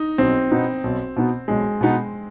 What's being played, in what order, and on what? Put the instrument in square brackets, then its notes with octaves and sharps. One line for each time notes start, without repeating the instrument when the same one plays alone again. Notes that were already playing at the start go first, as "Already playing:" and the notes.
Already playing: [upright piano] D#4
[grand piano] B1 [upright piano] C4
[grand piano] B2 B3 D#4
B1
B2 B3 D#4
[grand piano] B1 [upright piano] G#3
[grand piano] B2 B3 D#4